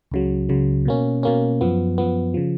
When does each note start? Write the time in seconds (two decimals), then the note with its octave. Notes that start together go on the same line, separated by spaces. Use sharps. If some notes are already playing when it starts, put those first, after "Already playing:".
0.11 C#2 C#3 F#3
0.49 C#2 C#3 F#3
0.85 B2 A#3 C#4
1.23 B2 A#3 C#4
1.61 F#2 F3 B3
1.98 F#2 F3 B3
2.34 C#3 F3